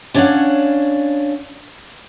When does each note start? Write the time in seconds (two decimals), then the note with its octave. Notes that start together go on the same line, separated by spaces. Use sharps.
0.14 C#4 D4 C#5 D5 F5 F#5